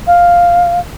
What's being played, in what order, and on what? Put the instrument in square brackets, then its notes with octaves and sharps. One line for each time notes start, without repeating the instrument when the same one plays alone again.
[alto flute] F5